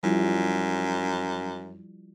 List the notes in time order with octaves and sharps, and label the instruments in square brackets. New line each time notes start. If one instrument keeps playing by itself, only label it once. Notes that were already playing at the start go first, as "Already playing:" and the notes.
[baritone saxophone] F#2 [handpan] F3 G3 E4